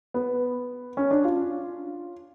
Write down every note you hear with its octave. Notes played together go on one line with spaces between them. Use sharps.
B3
C#4
D4
F4